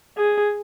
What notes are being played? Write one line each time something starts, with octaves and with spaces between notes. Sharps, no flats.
G#4